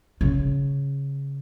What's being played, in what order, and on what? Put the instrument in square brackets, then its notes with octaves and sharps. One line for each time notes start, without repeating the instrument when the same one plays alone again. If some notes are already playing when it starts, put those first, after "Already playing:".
[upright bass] C#3